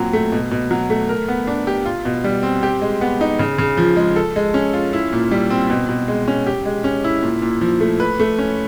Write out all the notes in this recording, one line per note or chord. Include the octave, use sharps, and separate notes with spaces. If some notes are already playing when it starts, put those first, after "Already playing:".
Already playing: A#2 F#3 C4
A3
B2
B2
F#3
A3
A#4
B3
D4
G4
F4
B2
G3
C4
G4
G#3
B3
D#4
C#3
C#3
F3
G#3
A4
G#3
C#4
F4
E4
A#2
G3
C4
B2
B2
G#3
C#4
G4
G#3
C#4
E4
A#2
A#2
F3
A3
B4
A3
C#4